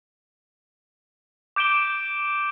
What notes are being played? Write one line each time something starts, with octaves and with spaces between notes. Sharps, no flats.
D6 G6 D7 E7 G7